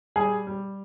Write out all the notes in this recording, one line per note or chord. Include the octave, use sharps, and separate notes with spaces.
G3 G#4
G3